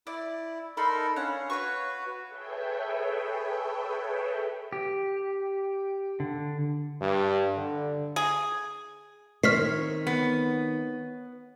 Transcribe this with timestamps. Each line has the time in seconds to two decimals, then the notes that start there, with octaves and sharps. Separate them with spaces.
0.07 E4 D5
0.77 D#4 A4 A#4 B5 C6
1.16 C#4 D4 C#5 F5 F#5
1.50 F#4 B4 C#5 F5 C#6
2.28 G#4 A4 B4 C#5 E5 G5
4.72 G4
6.20 D3
7.01 G2
7.56 D3
8.16 G#4
9.44 D#3 C4 C#5 F6 B6 C7
10.07 B3